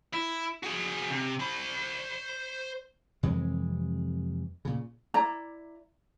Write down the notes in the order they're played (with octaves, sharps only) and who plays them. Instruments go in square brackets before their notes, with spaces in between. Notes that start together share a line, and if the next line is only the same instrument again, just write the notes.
[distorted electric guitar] E4
F#4 G#4
C3
C5 B5
[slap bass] F2 C3 E3 G#3
A#2 C#3
[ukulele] E4 D5 A#5